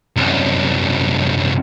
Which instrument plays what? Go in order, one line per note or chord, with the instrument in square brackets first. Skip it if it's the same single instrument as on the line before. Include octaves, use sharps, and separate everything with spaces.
[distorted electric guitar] C2 F#2